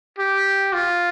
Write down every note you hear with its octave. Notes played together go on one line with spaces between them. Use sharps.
G4
F4